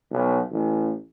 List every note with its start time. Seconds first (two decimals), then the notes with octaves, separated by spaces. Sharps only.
0.11 B1
0.51 A1